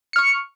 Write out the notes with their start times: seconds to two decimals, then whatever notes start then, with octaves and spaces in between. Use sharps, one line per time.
0.13 C#7
0.16 F6
0.18 C#6